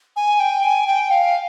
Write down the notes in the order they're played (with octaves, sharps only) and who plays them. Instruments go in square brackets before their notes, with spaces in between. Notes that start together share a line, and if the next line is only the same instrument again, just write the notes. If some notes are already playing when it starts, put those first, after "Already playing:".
[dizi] G#5
G5
G#5
G5
F5